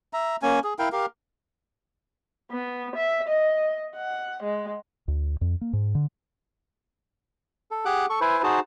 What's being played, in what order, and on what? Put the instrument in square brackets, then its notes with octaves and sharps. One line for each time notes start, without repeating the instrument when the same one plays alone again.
[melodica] E5 A#5
A#3 C#4 G#5
G#4
E4 A#4 F5 G5
G4 A#4 F5
[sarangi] B3
E5
D#5
F#5
G#3
[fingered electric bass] D2
F2
A#3
G#2
D3
[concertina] A4
G4 G#4 F#5 D6 F#6
A4 C#6
E4 B4 C5 G#5
D#4 F#4 G#4 C5 A5